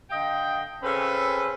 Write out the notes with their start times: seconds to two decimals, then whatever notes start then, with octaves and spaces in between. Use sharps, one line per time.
0.11 D3 D#5 F5 G5
0.83 C#3 C4 C#4 A4 B4